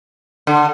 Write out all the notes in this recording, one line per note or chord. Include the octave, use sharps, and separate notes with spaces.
D3